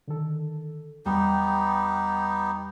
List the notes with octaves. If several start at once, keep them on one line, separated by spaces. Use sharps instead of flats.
D3 D#3 A4
E2 G3 B3 D#4 G4